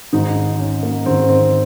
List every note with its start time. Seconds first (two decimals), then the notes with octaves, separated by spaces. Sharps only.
0.13 G#1 G#2 D#3 D#4
0.36 D#4
0.59 C#4
0.83 A#3
1.06 G#1 G#2 D#3 C4
1.29 C4